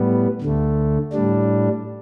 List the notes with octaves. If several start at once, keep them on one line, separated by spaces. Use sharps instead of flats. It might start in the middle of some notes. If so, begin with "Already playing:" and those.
Already playing: A2 G3 B3
D2 D3 A3
A2 G3 D4